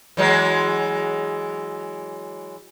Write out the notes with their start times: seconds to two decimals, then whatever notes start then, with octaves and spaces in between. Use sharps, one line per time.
0.17 E3 F#3 G#3